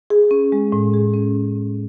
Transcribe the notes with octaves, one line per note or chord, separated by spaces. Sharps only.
G#4
C#4
G#3
A2
G#4
C#4